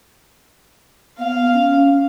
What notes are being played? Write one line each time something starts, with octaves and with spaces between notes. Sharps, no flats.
B3 F5
C#4